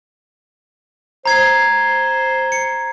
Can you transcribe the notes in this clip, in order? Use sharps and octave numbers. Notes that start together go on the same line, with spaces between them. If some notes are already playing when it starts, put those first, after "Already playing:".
C5 A#5 G#6 C7
C#7